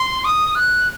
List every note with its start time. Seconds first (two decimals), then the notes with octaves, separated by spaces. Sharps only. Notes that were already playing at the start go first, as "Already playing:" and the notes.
Already playing: C6
0.25 D#6
0.55 F#6